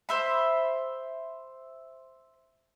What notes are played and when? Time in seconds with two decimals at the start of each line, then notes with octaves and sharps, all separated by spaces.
0.09 C5 E5 B5